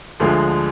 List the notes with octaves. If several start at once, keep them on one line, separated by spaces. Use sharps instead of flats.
D2 D3 F3 G#3